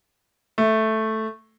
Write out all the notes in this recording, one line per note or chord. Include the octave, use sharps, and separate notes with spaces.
A3